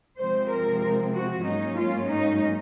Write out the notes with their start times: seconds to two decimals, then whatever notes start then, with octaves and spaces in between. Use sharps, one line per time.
0.18 C3 F3 G#3 C4 C5
0.50 A#4
1.13 F#4
1.44 G#2 F#3 A#3 C#4 D#4
1.75 F4
2.07 D#4